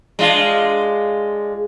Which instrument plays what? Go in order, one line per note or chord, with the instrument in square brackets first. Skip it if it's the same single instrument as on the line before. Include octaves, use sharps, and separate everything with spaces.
[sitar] G#3 D4 F4